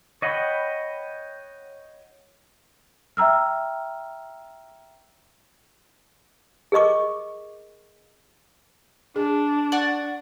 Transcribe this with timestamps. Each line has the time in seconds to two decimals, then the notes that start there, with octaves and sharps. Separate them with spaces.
0.22 C#5 D#5 F#5 G5 B5
3.17 E5 G5 A#5 E6 F6
6.72 G#4 A#4 D#5 C#6 D6
9.16 D4 G#4
9.72 D5 F#5 C#6